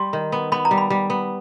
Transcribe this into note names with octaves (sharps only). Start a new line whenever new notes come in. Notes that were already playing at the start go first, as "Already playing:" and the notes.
Already playing: G3 C6
D#3
B3
B3 B5
A#5
G3
B5
G3
B3